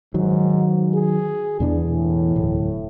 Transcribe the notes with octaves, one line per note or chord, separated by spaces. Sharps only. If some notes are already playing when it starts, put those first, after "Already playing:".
G#2 D#3 F#3
G#4
E2 B2 E3 D4
A2
D1